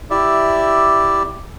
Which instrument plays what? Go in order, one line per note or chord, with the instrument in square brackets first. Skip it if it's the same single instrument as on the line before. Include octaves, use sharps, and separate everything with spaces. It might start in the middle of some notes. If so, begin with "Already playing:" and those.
[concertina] E4 G4 D5 E5